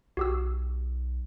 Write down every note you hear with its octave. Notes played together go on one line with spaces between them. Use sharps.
B1 F#4 G4 E6